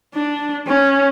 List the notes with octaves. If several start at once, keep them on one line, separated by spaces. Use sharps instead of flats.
D4
C#4